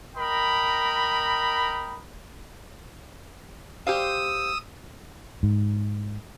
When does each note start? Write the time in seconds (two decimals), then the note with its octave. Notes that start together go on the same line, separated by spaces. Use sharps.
0.16 A#4 D#5 G5 B5
3.87 G4 C5 F5 D#6 E6
5.43 G#2